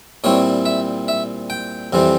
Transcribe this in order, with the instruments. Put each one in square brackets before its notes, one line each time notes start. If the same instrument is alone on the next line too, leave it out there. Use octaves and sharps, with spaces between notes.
[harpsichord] A#2 G3 C4 E4 C#5
E5
E5
G5
F2 C3 E3 G3 C4